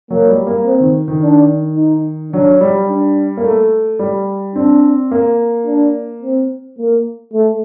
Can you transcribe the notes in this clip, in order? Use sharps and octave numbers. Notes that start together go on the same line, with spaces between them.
F#3 A#3
G3
A#3
C4
D#3
D#3
D4
D#4
F#3 D4
G3
D4
A#3
A3
G3
C4 D4
A#3
D4
C4
A#3
A3